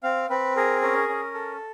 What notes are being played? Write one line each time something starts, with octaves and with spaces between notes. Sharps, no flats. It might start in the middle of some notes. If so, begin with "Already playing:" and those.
C4 F5
C4 B4
G#4 A#4
C#4 A#4
C#4
A4